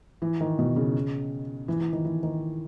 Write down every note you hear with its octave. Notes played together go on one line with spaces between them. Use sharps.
E3
D#3
B2
C#3
E3
E3
D#3
E3
D#3